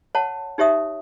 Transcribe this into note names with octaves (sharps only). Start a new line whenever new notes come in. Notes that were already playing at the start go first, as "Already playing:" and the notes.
C#5 F#5 A5
D#4 G4 C#5 E5 D#6